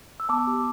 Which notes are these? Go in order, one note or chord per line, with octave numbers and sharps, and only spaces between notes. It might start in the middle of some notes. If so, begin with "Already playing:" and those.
E6
B3 A5 D6
G4